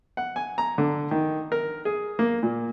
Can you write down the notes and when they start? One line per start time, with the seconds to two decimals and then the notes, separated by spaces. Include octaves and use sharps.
0.17 F#5
0.36 G#5
0.58 A#5
0.78 D3
1.11 D#3
1.52 A#4
1.85 G#4
2.19 A#3
2.43 A#2